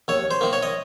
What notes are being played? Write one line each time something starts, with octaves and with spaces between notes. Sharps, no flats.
D#2 C#5
C5
D#3 A#3
C#5
D#5